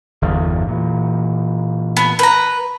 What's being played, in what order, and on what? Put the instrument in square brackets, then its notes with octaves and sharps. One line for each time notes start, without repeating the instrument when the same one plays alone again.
[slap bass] G1 E2 G2
A#2 E3
[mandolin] B3
B4 A#5